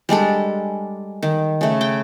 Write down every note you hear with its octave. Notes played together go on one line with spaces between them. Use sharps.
G3 G#3 D4 A4
D#3
C#3 A3
G5